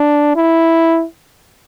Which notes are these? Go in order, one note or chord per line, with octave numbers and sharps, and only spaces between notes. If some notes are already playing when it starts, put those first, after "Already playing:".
Already playing: D4
E4